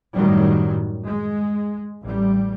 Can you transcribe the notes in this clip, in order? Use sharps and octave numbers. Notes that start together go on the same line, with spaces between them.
F#2 A2 D#3 F#3 G3
G#3
A1 G3